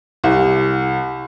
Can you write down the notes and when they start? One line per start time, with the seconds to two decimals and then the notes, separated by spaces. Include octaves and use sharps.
0.24 C2